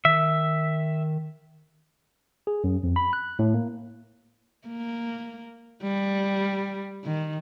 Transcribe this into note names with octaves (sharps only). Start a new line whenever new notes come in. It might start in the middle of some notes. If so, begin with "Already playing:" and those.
D#3 E5
G#4
F#2
F2
B5
F#6
A2
A#3
A#3
G3
D#3